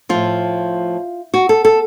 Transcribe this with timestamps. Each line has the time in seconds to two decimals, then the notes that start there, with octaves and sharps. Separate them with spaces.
0.09 A2 F3 F4
1.34 F#4
1.49 A4
1.65 A4